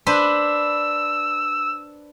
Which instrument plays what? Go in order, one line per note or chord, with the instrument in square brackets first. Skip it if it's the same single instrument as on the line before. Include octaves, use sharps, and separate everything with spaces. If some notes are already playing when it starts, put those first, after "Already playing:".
[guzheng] D4 B4 C5 [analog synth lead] E6